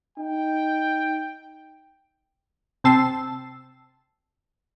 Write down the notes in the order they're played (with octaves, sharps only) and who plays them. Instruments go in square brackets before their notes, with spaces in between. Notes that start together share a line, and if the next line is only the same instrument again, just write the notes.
[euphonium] D#4 [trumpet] G5
[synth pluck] C3 C4 G5 A5 E6 C7